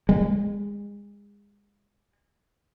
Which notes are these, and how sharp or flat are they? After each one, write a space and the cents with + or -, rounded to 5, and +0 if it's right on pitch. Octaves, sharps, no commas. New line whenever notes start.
G#3 -30